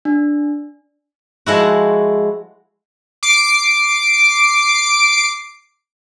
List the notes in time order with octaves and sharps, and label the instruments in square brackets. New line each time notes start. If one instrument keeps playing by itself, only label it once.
[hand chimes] D4
[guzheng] F3 G#3 E4 F#4
[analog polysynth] D6 C7 D7